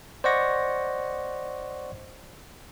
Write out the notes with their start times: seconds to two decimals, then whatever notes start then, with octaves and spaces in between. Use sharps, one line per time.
0.24 C5 D5 D#5 F#5 C#6 A#6